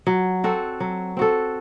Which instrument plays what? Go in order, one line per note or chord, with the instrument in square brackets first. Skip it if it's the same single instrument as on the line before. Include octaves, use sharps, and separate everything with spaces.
[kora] F#3
C4 F#4 A4
F#3
C4 F#4 A4